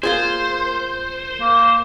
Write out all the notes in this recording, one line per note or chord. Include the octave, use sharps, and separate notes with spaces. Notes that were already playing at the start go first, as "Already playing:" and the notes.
A#3 F4 G#4 C5
A#3